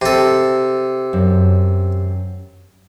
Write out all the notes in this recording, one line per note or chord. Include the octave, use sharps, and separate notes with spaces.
C3 A4
F#2